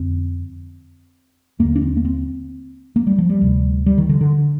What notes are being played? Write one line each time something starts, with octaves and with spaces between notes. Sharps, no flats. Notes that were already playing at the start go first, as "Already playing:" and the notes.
Already playing: F2 D3 C4
D#2 D3 A#3
D4
C4
A#3
C4
A#3
G3
F3
G3
D2 C3
G3
D#3
D3
D3